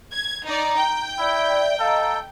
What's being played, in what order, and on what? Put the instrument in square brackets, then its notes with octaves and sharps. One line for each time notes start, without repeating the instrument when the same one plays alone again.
[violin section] G#6
[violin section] D#4 D5 [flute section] A#5
[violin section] G5
[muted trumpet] E4 [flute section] D5 E5
[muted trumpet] A4 [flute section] D#5 F5 A#5